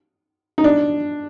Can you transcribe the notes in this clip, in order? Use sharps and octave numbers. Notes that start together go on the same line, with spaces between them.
D#4
D4